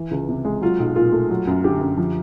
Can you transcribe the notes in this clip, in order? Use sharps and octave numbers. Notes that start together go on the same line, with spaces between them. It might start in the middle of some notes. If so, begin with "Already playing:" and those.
Already playing: E3
C#2
C3
G#3
F#3 F4
B1
A#2 F4
A3
F#3
F#2
D3 G4
F#2
F3